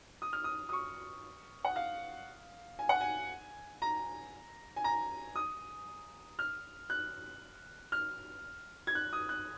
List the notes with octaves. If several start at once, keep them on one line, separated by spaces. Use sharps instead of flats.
D#6
F6
D#6
D#6
C#6
F#5
F5
G#5
F#5
G#5
A#5
G#5
A#5
D#6
F6
F#6
F6
G#6
F#6
D#6
F#6